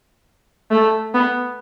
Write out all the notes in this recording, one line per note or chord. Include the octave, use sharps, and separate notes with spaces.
A3
B3